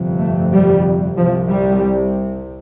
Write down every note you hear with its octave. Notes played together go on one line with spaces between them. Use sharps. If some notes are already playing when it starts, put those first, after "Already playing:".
Already playing: G1 F2 C3
A3
G3
C2 C3 F3
G3